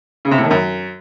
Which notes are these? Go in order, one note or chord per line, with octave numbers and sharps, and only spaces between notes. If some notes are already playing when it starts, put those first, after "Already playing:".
C#3
C3
A2
D#3
F#2